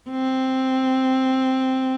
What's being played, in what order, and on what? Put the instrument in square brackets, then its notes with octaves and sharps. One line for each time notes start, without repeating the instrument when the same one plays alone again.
[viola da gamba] C4